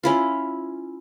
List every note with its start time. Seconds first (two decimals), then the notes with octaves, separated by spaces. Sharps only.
0.03 C#4 E4 F4